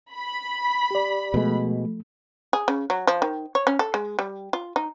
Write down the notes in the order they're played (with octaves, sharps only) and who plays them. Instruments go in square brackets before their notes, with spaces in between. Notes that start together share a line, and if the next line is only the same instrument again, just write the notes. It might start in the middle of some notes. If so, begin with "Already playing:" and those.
[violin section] B5
[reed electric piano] G4 D5
[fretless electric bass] B2 G#3 [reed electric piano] F3 A3
[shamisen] G#4
C#3
F#3
F3
D#3
C#5
C#4
A4
G#3
G3
F4
D#4